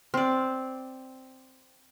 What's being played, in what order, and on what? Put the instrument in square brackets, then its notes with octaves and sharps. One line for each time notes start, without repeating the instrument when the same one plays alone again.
[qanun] C4 D5